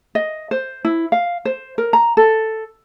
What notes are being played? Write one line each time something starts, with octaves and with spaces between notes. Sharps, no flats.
D#5
C5
E4
F5
C5
A#4
A#5
A4